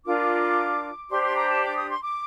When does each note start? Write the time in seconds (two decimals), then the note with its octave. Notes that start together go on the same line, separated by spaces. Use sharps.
0.05 D4 F4 A#4 D6
1.10 D4 G4 C5 C6
1.23 C6
1.36 A#5
1.49 A5
1.62 D6
1.76 D#6
1.89 C6
2.02 D6